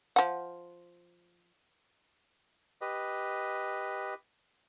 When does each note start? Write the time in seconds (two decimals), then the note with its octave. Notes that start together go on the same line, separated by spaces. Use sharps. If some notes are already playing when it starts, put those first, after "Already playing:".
0.16 F3 F#5
2.81 G4 B4 D#5